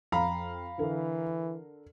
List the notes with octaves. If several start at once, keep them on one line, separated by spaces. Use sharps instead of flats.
F2 F5 A#5 B5
D3 E3 A4 A#4